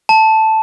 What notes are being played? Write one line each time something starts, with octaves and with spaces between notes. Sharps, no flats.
A5